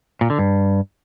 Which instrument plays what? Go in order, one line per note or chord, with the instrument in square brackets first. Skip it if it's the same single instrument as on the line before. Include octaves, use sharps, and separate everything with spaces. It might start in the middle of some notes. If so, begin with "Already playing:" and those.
[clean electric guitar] A#2
D3
G2